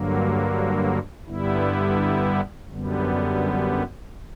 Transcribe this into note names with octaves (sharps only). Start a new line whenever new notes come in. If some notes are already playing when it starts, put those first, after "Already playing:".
Already playing: G2 D3 F#3 A#3
G2 D3 G3 B3 E4
F#2 D3 G3 B3